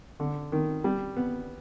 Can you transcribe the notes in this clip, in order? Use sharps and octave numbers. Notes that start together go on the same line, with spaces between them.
D3
D#3
G3
B3